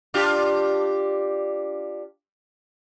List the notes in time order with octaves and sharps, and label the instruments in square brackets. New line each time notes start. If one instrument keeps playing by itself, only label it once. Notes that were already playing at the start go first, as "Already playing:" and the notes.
[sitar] D4 F4 G4